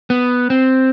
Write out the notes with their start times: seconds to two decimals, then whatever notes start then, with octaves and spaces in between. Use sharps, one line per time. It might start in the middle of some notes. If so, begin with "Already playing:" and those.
0.10 B3
0.50 C4